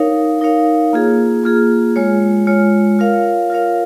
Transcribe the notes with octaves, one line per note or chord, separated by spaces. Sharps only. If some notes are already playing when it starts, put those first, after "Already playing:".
Already playing: D#4 A#4 C#5 F5
D#4 A#4 C#5 F5
A#3 F4 G#4
A#3 F4 G#4
G#3 F4 C#5
G#3 F4 C#5
F4 A#4 C#5 F5
F4 A#4 C#5 F5